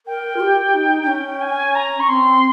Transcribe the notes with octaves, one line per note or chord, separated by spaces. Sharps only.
A#4 G5
F4
G4
D#4
D#4
C#4
G#5
A#5
C#6
C4 C6